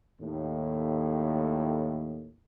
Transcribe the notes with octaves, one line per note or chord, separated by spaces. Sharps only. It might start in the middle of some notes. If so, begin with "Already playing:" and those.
D#2 A2